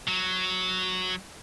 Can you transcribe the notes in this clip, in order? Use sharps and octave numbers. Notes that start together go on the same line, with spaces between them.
F#3